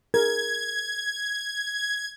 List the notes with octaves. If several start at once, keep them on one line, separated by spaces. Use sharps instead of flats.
G#4 A#4 G#6